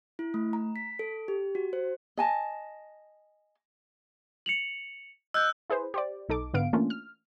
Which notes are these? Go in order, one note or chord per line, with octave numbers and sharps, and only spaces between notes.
E4
A3
A#5
B6
A4
G4
F#4
C5
D#5 G#5 A5
C#7 F7 F#7
D#5 E6 F#6 G6
E4 G#4 B4 C5
G4 C5 D5
B1 D#4 A4 D6
G#2 D3 B3 F5 D7
E3 A3 A#3 C#4 D4 F4
F6